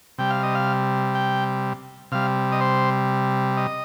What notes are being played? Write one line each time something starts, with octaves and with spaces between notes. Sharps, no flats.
C3 G3 G5
F5
D#5
F5
G5
C3 G3 F5
D#5
C5
D#5